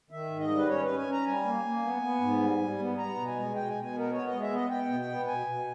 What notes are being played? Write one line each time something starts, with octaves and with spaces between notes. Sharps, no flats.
D#3 E5
G#2
D#5
G3
B4
C#4 C#5
B4
C#4
G#5
C#4
A#5
G3 G#5
A#3
A#3
B3
B3
G#2
G3
G3
B3
B3 A#5
B2
G#5
G#3
B2 G5
B2 G#5
G#5
B3 A#4
B3 C#5
G#3 D#5
E5
B3 D#5
B3 G5
B2
B3
B2 G#5
B2